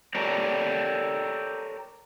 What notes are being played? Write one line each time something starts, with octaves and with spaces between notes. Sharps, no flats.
G4 A4 A#4 C#5 D5